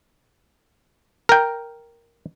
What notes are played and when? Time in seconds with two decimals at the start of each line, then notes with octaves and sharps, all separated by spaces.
1.29 A#4 G5